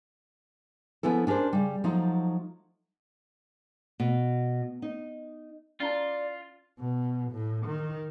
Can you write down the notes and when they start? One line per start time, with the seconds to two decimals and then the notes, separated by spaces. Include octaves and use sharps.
1.03 F3 B3 C#4 E4 A4
1.27 C#4 D4 G4 A#4 C5
1.53 C#3 G3
1.84 F3 F#3 A3 D#4
4.00 B2
4.82 D#4
5.80 C#4 E4 F4 D5 A5
6.79 B2
7.32 A2
7.67 D#3